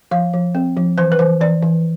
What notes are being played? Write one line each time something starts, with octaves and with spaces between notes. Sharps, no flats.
F3 F5
F3
C4
F3
E3 C5
B4
E3 C5
E3 D5
E3